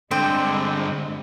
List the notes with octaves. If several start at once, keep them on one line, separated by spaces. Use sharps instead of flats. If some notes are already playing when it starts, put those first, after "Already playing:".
G2 D3 G#3 C4